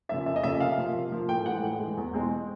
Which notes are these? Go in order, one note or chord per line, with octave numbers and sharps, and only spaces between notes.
C#3 F3 A#3 E5
F2 E5
D#5
C#3 F3 A#3 E5
C3 F5
F3 A#3
C3
F3 A#3
A2 G5
E3 G#3 F#5
A2
E3 G#3
E2
B2 G#3 C4